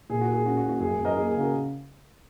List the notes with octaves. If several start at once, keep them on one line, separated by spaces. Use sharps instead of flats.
A#2 G#4
F#4
A#4
G#4
C#4 F#4
F#4
A#3
F#4
F#2 G#4
F#2
A#4 D#5
A#3 G#4
G#4
C#3
F#4 A#4